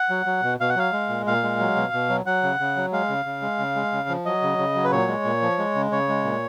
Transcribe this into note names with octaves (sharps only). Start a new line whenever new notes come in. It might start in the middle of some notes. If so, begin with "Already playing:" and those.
Already playing: F#5
F#3
F#3
B2
B2 F5
F#5
F#3 F5
G#3
A#2
A#2 F5
G#3
F#3
B2
B2
F#3
F#3 F#5
C#3
C#3
F#3
G#3 F5
C#3
C#3
G#3
C#3
G#3
C#3
F3
F#3 D#5
C#3
C#3
F#3
B4
A#2 C#5
G#3
A#2
F3
G#3
C#3
C#3 C#5
G#3
A#2